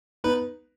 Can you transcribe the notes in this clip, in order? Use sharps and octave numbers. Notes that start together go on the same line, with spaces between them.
B3 D#4 B4